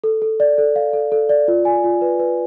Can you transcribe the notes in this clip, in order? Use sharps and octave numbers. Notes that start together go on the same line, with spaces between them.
A4
A4
D5
A4
F5
A4
A4
D5
F4
G#5
F4
B4
B4